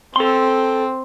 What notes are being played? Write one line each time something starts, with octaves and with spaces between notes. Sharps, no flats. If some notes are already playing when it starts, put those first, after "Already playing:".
C4 A4 C6